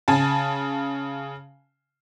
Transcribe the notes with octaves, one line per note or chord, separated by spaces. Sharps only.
C#3 G#5 A5